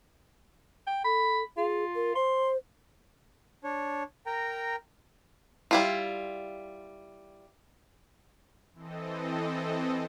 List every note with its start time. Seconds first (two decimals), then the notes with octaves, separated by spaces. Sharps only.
0.87 G5
1.05 A4 B5
1.57 F4 G#4
1.95 A#4
2.15 C5 C6
3.64 D4 C#5
4.26 A#4 G5 A#5
5.71 G3 E4 F4
8.74 E3 C4 A4 D#5